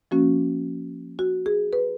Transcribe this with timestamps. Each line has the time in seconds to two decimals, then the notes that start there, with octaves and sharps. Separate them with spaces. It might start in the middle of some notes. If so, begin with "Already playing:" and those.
0.11 F3 A#3 C#4 F#4
1.19 F#4
1.46 G#4
1.73 B4